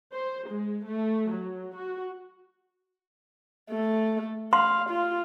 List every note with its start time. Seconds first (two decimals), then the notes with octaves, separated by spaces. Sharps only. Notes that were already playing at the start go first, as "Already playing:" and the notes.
0.13 C5
0.50 G#3
0.85 A3
1.31 F#3
1.76 F#4
3.71 A3
4.53 F5 C6
4.90 F4